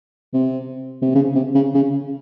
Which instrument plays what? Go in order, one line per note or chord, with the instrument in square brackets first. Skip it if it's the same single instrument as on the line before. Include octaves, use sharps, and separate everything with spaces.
[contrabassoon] C3
C3
C#3
C3
C#3
C#3